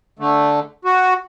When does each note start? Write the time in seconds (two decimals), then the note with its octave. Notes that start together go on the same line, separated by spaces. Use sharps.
0.19 D3 A3
0.85 F#4